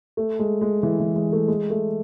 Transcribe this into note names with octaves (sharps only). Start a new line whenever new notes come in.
A3
G#3
G#3
E3
E3
G#3
A3
G#3
A3